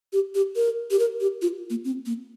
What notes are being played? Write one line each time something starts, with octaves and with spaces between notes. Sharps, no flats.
G4
G4
A#4
G4
A#4
G4
F4
A#3
C4
A#3